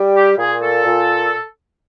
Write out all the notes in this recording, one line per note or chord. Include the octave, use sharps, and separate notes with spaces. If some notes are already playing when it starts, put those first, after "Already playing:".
Already playing: G3
G4
A#2 G#4
A4
A#2